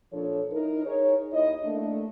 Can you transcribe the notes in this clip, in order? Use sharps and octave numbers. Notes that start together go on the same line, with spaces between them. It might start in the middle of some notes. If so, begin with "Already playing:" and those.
A#2 F3 D4 A4 C#5
D#4 E4 A#4
D#4 G#4 A#4 C#5
D#2 E4 D#5
A3 A#3 D4